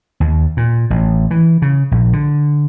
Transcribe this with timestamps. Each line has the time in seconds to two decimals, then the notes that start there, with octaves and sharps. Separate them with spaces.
0.20 D#2
0.57 A#2
0.90 A1
1.31 E3
1.62 C#3
1.92 A#1
2.13 D3